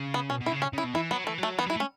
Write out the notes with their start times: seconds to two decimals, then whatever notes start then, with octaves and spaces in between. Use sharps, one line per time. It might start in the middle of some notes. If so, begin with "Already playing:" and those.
Already playing: C#3
0.14 B3
0.30 B2 C#4
0.41 B2
0.46 E4
0.52 C#3
0.62 C#4
0.73 C#3 E4
0.84 B2
0.94 E3 E4
1.11 F#3 B3
1.24 E3 A3
1.38 F#3
1.43 A3
1.59 E3 B3
1.66 F#3
1.70 E4
1.75 A3
1.80 C#4